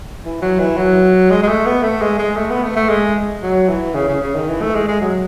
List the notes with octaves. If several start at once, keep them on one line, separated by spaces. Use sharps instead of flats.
E3
F#3
E3
F#3
G#3
G#3
A3
B3
A3
G#3
G#3
A3
B3
A3
A3
G#3
F#3
E3
C#3
C#3
C#3
D#3
E3
A3
G#3
G#3
F#3